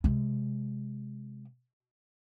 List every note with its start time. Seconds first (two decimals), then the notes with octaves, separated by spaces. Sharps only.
0.04 C3 G#3